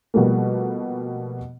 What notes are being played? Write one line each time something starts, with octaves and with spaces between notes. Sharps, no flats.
B2 F3 G3 A3 A#3